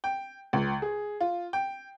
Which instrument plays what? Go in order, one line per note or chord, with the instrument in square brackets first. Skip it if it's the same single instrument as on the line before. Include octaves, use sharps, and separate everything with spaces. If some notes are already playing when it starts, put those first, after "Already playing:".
[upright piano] G5
C#2
G#4
F4
G5